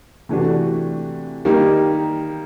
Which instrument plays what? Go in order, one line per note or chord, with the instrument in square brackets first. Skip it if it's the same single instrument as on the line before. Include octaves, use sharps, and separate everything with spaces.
[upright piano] C3 E3 A3 D4 F#4
D#3 G3 A#3 D#4 G4